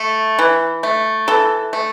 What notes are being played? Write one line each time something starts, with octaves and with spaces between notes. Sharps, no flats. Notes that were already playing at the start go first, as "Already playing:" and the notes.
Already playing: A3
E3
A3
E3 A4
A3